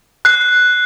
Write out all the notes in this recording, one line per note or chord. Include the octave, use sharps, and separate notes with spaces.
F#6 C7